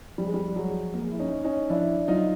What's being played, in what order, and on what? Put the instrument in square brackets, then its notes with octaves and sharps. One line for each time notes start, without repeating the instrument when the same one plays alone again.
[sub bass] F3 [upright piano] G3
[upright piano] G#3
G3
F#3 G#3
G#3 A#3
E4
C#4 D#4
C#4 D#4
[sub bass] F3 [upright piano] D4 E4
[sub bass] F#3 [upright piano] D#4 F4